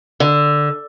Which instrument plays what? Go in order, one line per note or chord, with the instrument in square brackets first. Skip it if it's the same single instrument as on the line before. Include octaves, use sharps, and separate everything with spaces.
[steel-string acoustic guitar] D3